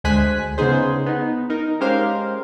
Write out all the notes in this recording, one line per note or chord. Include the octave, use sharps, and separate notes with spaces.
D2 G#3 C5 G#5 F#6 B6
C#3 B3 C#4 D#4 G#4 C5
B3 D#4
D#4 A#4
G#3 C#4 G4 A#4 C5 F5